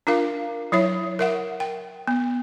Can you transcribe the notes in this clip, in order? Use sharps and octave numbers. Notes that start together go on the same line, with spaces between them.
D4 F4 A#4 F5
F#3 E4 C#5 E5
A#4 E5 F#5
G5
B3